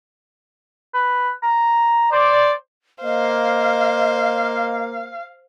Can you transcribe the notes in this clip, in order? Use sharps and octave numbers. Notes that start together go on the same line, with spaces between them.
B4
A#5
C5 D5
A#3 C5 D#5 F5